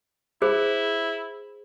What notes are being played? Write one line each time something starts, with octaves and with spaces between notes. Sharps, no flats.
E4 G#4 C5